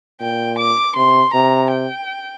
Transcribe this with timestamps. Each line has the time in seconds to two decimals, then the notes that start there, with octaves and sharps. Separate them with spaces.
0.21 A#2 G5
0.59 D6
0.96 C3 C6
1.34 C3 A#5
1.71 G5